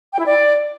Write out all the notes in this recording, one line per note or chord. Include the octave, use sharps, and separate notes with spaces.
G5
E4
D5